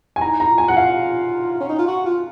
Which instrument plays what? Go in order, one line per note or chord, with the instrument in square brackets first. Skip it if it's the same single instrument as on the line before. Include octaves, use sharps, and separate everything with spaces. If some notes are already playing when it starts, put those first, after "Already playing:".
[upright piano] G#5
[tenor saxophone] D#4 [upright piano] A#5
[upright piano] A#5
[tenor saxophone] F4
[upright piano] G#5
F#5
F5
[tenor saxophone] C#4
D#4
F4
F#4
F4